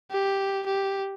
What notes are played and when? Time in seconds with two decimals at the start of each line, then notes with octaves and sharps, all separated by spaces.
0.11 G4
0.66 G4